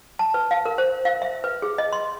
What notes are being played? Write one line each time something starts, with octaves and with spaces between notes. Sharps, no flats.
A5
B4
F5
A#4
C5
F5
E5
B4
G#4
D#5
C6